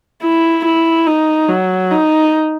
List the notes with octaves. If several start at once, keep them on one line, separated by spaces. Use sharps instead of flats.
E4
E4
D#4
F#3
D#4